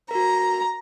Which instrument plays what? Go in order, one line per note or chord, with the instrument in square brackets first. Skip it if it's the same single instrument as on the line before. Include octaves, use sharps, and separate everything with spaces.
[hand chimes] F#4 A#4 [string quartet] A#5